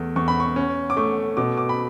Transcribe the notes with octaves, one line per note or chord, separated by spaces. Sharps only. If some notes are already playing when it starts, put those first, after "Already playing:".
Already playing: E2 A3
E2 C#6
B5
C#6
C#4
D6
A3 C#6
B2 D6
D6
B5